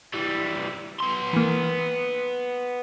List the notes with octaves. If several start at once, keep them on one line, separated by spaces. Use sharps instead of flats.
E3 G3
B3 C6
E3 A#3